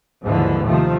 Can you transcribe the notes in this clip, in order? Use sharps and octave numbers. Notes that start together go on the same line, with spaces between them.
D#2 G#2 D3 E3 F3
C3 D#3 F3 A3